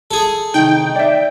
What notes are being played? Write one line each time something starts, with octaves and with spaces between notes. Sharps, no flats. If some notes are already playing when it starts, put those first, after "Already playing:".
G#4 A4
C2 D#3 D#4 G5
D5 E5